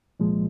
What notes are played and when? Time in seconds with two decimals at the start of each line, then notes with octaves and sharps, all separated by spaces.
0.20 C2 A#2 F3 G#3